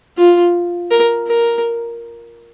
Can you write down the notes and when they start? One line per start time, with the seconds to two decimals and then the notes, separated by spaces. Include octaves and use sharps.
0.17 F4
0.91 A#4
1.27 A#4